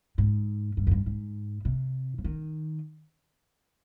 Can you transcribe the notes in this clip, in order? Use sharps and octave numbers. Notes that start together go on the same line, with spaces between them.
G#2
G2
F2
G2
G#2
C3
F3
D#3